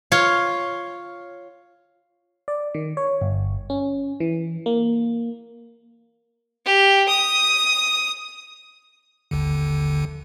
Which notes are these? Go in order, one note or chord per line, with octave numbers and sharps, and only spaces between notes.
F4 C#5
D5
D#3
C#5
G1
C#4
E3
A#3
G4
D#6
G#1 D#2 D3